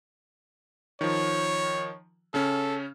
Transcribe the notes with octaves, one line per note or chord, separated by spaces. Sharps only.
D#3 F3 C#5
C#3 C#4 A4